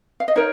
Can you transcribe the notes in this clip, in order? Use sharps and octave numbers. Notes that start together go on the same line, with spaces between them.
F5
D#5
D#4 A#4 C#5